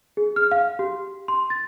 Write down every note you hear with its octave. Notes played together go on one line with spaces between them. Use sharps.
G#4
F6
F5
G4
C6
A6